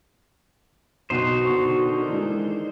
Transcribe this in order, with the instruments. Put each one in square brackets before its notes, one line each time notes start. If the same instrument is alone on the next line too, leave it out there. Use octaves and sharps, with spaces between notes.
[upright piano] B1 B2 F#6 [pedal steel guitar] D#4 C5 [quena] F#4
[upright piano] B2 C#6 [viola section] D3 D#3
[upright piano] E3 G#3